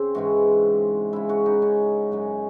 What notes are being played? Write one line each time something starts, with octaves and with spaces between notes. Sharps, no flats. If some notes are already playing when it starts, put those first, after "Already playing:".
Already playing: C#3 C4
G#2 E3 G#3 F#4
C#3 G#3 E4
F#4
D#4
C#4
F#2 C#3 G#3